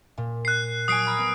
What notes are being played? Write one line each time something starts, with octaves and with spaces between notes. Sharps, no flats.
A#2
F#6 C7
F#3 G#5 D#6 C7 D7
A#5 B5 F6
B3